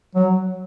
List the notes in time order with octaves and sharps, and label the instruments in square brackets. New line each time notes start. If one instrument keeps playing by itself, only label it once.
[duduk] F#3